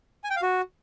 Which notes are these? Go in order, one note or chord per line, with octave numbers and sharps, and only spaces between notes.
G#5
G5
F5
F#4